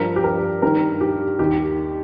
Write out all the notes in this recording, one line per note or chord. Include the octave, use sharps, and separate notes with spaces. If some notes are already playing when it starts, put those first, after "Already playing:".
Already playing: G2 F3 A#4
G4
A#4
G2 D#3 A#4
G4
D#2 D#3 G4